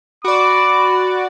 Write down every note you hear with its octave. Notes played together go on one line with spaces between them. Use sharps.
F#4 D5 B5 D6